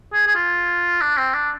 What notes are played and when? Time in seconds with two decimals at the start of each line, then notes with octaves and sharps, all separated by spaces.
0.13 G#4
0.27 G#4
0.35 F4
1.01 D4
1.17 C4
1.34 D4